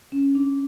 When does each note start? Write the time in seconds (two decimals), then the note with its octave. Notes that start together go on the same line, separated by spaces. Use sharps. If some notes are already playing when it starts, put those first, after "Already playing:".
0.12 C#4
0.35 D4